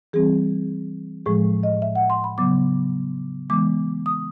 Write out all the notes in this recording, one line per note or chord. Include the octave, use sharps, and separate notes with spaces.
E3 G3 C4 G#4
A2 F3 G#3 G#4
D#5
E5
F#5
C6
B5
C#3 F#3 B3 D6
E3 G#3 B3 D6
D#6